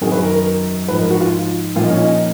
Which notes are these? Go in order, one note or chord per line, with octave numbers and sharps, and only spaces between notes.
F#2 D#3 F#3 G#4
B4
A#4
A#4
G#2 F3 B4
A#4
F#4
F4
A#2 F3 F4
D#4
C#4
D#4